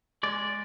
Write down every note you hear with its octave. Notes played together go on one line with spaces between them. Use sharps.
G#3 D5